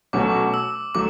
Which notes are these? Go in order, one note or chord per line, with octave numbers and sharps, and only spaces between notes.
B2 F#3 A3 C#4 F#4 D6
E6
F#3 A3 D6